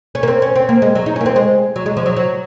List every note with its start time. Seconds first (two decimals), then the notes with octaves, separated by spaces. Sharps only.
0.15 C#4
0.23 A#3
0.28 C4
0.42 C#4
0.56 C4
0.69 A#3
0.82 G#3
0.95 F#3
1.06 D#4
1.16 C#4
1.21 A#3
1.26 C4
1.36 G#3
1.76 F#3
1.86 G#3
1.97 F3
2.06 F#3
2.16 F#3